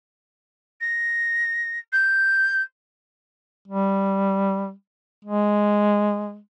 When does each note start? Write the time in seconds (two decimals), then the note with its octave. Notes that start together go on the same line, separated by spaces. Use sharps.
0.81 A#6
1.92 G6
3.67 G3
5.25 G#3